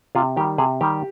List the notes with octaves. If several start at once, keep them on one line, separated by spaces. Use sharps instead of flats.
C3 F4
D#3 G3 G4
C3 G#4
D#3 G3 G4